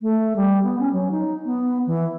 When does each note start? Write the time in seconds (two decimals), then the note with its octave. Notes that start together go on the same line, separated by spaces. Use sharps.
0.01 A3
0.36 G3
0.64 B3
0.80 C#4
0.93 F#3
1.11 D#4
1.45 B3
1.87 E3